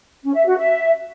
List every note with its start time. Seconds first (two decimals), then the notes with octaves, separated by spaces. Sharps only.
0.22 C#4
0.34 E5
0.46 F#4
0.57 E5